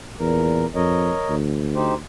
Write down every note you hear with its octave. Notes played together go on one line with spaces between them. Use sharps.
E2 A#2 A#4
F2 A#4 C#5 D#5
D2
D#4 G4 C5